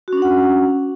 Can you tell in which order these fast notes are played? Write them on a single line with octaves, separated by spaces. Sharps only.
F#4 C#4 D4 F#5